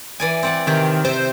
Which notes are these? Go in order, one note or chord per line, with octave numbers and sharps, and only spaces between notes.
E3 D5 G#5
C4 D5 F#5
C3 D#3 G4
C3 C5 E5